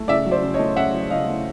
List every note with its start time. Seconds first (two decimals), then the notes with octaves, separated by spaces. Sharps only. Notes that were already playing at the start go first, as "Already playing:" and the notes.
Already playing: A3
0.08 C#3 D5 E5
0.26 F#3
0.31 C5 D5
0.42 C#3
0.54 C#5 D#5
0.59 A3
0.76 C#3 E5 F#5
0.94 F#3
1.10 C#3 D#5 F5
1.27 A3